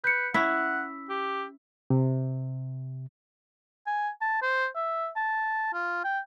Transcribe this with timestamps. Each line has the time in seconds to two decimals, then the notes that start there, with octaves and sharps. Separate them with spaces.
0.04 B4 G6 C#7
0.34 C#4 E4 F#5 E6 B6
1.09 G4
1.90 C3
3.87 G#5
4.21 A5
4.42 C5
4.76 E5
5.16 A5
5.73 F4
6.04 G5